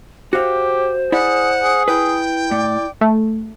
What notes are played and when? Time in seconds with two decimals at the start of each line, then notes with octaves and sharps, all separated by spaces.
0.33 F#4 G4 C5 F5
1.12 E4 G#4 D5 E5 F#5
1.63 G#4
1.88 E4 B4 G5
2.51 A2 D5
3.01 A3